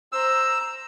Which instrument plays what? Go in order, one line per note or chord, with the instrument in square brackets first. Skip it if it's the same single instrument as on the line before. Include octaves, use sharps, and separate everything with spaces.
[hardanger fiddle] C5 A#5 [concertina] E6